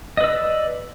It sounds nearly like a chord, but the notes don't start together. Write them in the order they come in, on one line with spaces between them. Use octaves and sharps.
D#5 B4 E6 D5